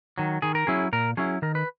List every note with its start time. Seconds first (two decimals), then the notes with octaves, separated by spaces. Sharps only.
0.18 D#3 F#3
0.42 D#3 G#4
0.55 A#4
0.67 F#3 C#4 E4 G#4
0.93 A#2 A#4
1.17 F#3 C#4 E4 G#4
1.42 D#3 A#4
1.55 B4